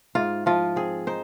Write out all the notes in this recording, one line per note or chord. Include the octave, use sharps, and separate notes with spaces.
G#2 F4
F3 F4
C4 G#4
D#4 C5